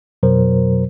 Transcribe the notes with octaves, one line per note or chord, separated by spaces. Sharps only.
F2 B2 F#3 A#4 C5